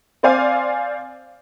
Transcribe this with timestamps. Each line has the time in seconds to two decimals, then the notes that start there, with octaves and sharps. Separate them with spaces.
0.23 C4 C5 D5 F5 G#5